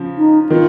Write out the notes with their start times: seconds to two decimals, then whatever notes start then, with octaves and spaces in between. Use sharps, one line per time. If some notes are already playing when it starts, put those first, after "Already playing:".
Already playing: C#3 F3
0.18 D#4
0.49 D#3 F4